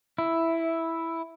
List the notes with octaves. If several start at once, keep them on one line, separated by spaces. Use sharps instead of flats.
E4